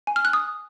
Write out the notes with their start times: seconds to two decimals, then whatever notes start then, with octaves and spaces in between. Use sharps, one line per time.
0.07 G#5
0.16 F6
0.25 F#6
0.33 D#6